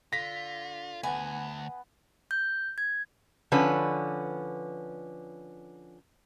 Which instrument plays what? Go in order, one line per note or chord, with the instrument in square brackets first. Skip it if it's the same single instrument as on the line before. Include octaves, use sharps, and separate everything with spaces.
[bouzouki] D3 [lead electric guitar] F4 [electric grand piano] A#6 B6
[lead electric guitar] D2 [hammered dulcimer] B3 F#5 [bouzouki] G#5
[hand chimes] G6
G#6
[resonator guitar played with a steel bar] D3 F3 C#4 B4